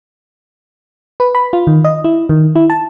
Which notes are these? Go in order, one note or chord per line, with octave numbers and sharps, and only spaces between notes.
B4
B5
F4
D#3
D#5
E4
D#3
E4
A5